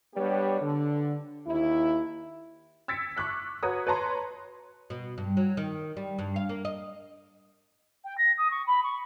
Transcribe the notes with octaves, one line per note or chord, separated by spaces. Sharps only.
G3 B3 D4 G4 B4 C#5
D3
D#2 E4
E6 G#6 A6 B6 C#7 D7
C#6 D6 F#6 B6
F#4 B4 C#5 A#5 D#6
B4 C#5 A5 A#5 C6
B2
G2
F#3
D#3
G3
G2
F5
A#3
D#5
G5
A#6
D#6
C#6
B5
C#6